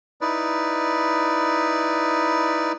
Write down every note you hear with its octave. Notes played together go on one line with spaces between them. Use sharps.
D#4 E4 B4 D5